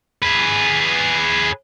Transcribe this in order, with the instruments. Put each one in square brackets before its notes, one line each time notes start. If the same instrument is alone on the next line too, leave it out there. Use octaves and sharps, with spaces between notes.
[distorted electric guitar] G#4 B4